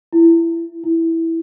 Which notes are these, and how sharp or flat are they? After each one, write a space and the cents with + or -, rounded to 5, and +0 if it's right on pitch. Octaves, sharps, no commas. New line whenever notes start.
E4 +20
E4 -5